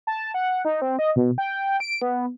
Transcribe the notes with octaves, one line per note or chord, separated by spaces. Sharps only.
A5
F#5
D#4
C4
D#5
B2
G5
D7
B3